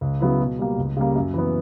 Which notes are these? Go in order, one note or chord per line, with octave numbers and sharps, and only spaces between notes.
C#2
C#3 F#3 B3 E4
B2
G3 A#3
C#2
C#3 G3 A#3
F#2
E3 B3